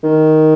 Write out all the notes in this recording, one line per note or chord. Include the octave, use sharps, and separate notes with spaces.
D#3